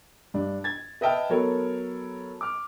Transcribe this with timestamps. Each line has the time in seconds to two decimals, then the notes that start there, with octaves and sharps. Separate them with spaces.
0.34 G2 D4
0.64 G#6 A6
1.01 B4 D#5 E5 G5 A5 F6
1.29 F#3 B3 A4 A#4 C#5
2.41 D6 F6